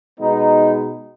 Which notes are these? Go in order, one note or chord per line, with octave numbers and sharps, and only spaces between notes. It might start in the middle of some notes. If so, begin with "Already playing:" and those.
B2 G#3 B3 D#4